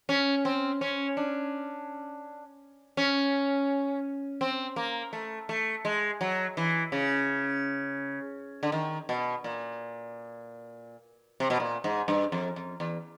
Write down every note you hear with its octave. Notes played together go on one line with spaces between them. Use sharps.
C#4
C4
C#4
D4
C#4
C4
A#3
A3
A3
G#3
F#3
E3
C#3
D3
D#3
B2
A#2
C3
B2
A#2
G#2
G2
F2
F2
E2